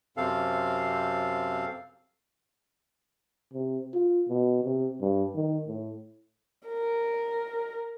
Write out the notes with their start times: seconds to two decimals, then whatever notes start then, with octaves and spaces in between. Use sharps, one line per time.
0.17 F#2 C3 C4 A4 F5
3.54 C3
3.94 F4
4.29 B2
4.64 C3
5.01 G2
5.35 D#3
5.67 A2
6.68 A#4